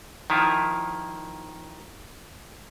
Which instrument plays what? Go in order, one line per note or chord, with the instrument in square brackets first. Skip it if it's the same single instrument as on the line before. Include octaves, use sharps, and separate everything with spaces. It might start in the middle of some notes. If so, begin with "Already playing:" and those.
[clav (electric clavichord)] D#3 F3 E4 F4